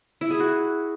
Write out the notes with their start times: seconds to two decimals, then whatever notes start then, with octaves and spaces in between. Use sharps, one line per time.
0.21 E4
0.30 G#4
0.40 F#4